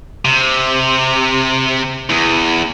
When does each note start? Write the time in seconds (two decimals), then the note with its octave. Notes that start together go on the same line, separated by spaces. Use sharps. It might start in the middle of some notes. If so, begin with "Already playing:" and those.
0.25 C3
2.09 E2